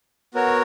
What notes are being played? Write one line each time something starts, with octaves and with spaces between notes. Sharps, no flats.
B3 F#4 A#4 C#5